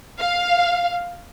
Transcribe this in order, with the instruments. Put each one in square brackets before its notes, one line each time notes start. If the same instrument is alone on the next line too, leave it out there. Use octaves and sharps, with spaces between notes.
[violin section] F5